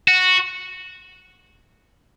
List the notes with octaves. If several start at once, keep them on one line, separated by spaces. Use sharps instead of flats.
F#4